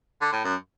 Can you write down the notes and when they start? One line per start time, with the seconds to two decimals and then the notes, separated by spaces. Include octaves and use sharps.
0.21 D3
0.32 A2
0.44 F#2